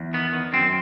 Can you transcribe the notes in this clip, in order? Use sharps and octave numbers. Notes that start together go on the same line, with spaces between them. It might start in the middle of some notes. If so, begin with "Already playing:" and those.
Already playing: E2
D#3 B3
D#3
F#2 C4